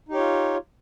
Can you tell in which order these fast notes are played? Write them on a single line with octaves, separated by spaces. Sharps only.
D#4 G4 C#5 F4